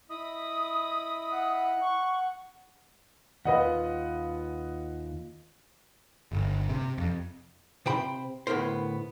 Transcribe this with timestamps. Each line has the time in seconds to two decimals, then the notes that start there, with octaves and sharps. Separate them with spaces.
0.10 E4 D#5 B5 D#6
1.31 F#5
1.81 C#6
3.45 D#2 F4 B4 D#5 F#5
6.32 G1
6.69 C3
6.98 F2
7.86 C3 C5 G5 B5
8.47 D2 A2 B3 A#4 C5